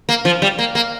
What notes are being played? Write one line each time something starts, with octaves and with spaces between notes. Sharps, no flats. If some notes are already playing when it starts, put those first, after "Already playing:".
A#3
F3
G3
A#3
A#3